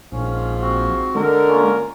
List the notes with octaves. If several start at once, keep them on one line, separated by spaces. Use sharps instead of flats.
A#1 G#2 F3 C#4 F5
C4 F#4
D3 G#3 A#4
A#3 C#4 F4